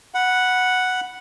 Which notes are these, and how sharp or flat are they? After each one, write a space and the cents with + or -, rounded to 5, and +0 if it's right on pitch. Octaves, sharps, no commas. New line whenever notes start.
F#5 +0 B5 -5